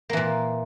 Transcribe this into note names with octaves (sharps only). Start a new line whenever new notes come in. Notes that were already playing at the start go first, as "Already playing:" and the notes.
A#2 E3 A#3